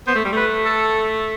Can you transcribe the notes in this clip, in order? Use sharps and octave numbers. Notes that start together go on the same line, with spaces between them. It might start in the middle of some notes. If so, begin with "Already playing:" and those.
B3 C5
A3
G3
A3 B4
A4